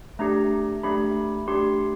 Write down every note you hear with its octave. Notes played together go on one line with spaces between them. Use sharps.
A3 D4 G4 A#5
A3 D4 G4 B5
A3 D4 G4 C6